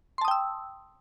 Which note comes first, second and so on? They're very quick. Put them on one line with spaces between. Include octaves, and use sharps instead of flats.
C6 A5 D#6 G5 E6